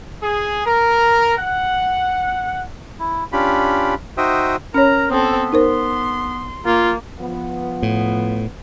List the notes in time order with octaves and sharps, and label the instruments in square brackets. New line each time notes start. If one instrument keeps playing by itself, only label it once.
[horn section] G#4
A#4
F#5
[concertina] E4
C#4 D4 F4 G4 B5
D#4 F#4 C5 E5 G5 D#6
[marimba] C#4 C#5 [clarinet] A#4 [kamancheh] A#5
[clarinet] B3 [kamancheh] C4 A4
[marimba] D#4 A#4 C5 [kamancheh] C6
[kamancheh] A#3 [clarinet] F4
[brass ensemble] F3 B3
[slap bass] A2